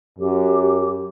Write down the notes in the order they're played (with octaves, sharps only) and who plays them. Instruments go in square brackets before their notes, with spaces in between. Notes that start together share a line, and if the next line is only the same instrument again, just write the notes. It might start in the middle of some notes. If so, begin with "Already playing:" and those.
[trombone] F#2 [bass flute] G4